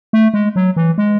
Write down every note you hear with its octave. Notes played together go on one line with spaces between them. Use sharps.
A3
G#3
F#3
E3
G#3